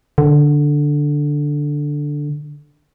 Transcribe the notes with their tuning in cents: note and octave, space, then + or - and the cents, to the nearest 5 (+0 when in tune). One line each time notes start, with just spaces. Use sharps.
D3 +0